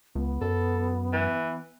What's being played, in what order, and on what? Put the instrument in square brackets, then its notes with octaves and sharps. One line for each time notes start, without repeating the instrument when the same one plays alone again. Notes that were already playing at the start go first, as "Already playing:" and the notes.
[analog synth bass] C#2 [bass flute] B3
[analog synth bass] F#2 [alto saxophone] A4
[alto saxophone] E3